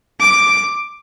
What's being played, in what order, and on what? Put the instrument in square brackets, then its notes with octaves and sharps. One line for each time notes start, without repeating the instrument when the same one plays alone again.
[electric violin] D6